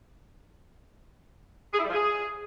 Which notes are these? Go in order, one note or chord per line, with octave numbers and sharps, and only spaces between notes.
G#4
E4
G3
F3
G#4